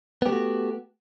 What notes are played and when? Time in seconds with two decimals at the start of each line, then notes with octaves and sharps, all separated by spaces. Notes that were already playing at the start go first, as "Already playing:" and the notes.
0.22 B3
0.26 G4
0.29 A3
0.32 F#4